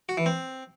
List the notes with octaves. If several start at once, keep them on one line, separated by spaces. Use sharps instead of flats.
F#4
E3
C4